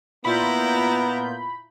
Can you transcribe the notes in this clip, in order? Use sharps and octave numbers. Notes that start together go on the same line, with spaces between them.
A#2 B3 E4 F4 A#5 B5 G6